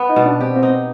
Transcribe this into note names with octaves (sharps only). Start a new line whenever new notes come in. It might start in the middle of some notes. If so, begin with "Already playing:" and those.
Already playing: B3
D#4
B2
D4
C4 G4
C4
D#4